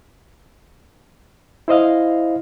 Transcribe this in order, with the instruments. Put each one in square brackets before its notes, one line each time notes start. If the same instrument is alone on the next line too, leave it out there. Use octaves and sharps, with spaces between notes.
[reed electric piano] E4 C5 D#5 F5